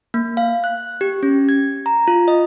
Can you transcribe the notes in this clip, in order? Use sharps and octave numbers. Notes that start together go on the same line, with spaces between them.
A#3
F5
F#6
G4
C#4
G#6
A#5
F4
D#5